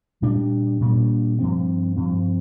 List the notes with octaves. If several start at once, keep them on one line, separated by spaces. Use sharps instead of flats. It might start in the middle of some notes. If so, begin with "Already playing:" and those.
A#2 G3 D4
A#2 G3 D4
G2 F3 C4
G2 F3 C4